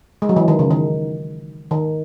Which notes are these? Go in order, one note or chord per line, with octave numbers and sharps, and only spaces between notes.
G#3
F#3
E3
D#3
C#3
D#3
D#3